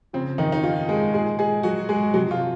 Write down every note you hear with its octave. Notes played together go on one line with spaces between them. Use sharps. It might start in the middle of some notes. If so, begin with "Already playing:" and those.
C#3 F3 C4
D#3 D#4
D#4
F3 F4
G#3 G#4
A#2 F3 G#3 G#4
G#3 G#4
F#3 F#4
G#3 G#4
C3 F3 F#3 F#4
F3 F4